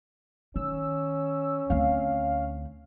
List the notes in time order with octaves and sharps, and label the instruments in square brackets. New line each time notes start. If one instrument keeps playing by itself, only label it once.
[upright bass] D#3 [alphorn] C#4 [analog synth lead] E6
[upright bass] D2 C4 [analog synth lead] F5